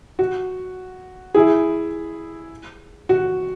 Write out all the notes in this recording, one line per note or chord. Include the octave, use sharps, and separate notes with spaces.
F#4
E4 G#4
F#4